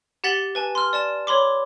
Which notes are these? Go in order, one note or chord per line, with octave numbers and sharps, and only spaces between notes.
G4 F#5 A6 B6 F#7 G7
B4 G#5 A5
C6 F6
D5 A5 E7
C#5 B5 C6 D6